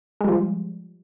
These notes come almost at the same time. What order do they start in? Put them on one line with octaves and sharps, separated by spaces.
G#3 G3 F3